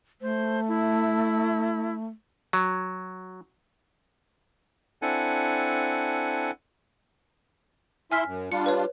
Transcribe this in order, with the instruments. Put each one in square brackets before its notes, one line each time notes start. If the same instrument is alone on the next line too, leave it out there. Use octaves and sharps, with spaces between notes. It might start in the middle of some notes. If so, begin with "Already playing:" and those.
[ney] A3 [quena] C5
[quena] E4
[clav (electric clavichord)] F#3
[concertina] C4 D4 E4 A4 F#5 G#5
[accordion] E4 E5 C6 [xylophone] G#5 F6 B6
[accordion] F#2
[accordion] G3 D4 F4 [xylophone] C#7
[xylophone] B4 C#5